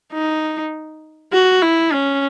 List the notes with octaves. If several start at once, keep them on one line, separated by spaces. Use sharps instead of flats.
D#4
F#4
E4
C#4